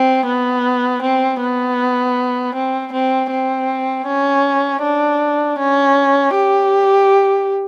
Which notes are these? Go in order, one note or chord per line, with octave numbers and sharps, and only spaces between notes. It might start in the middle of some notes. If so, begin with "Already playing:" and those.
Already playing: C4
B3
C4
B3
C4
C4
C4
C#4
D4
C#4
G4